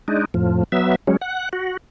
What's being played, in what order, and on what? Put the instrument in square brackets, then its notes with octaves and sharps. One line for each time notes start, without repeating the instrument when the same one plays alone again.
[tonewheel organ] G#3 D4 D#4
F2 A2 F3
F#3 B3 E5
F#3 G#3 C#4
F#5
F#4